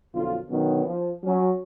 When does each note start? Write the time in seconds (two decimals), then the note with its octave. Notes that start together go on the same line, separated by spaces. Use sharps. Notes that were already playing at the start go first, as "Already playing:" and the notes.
0.14 B1 F#2 D3 F3 F4
0.50 B2 D3 D#3 F#3 B3 C#4
0.86 F3
1.24 F#3 C#4